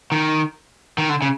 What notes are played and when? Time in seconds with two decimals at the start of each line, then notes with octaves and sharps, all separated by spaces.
0.12 D#3
0.98 D#3
1.09 D3
1.22 C#3